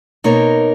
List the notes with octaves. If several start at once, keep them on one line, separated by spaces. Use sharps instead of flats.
B2 A#3 D#4 A#4 C#5